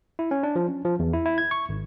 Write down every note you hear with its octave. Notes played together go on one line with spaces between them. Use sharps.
E4
C#4
D4
F3
C#4
F3
E2
E4
E4
G#6
C#6
G#1